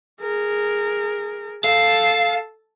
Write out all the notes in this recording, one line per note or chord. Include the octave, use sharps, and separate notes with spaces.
G#4 A#4
A4 F5 A5